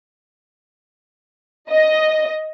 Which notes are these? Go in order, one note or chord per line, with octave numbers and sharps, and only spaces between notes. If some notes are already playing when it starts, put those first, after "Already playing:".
D#5